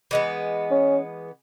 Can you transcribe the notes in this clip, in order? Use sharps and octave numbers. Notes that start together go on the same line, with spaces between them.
E3 G#3 B3
C#4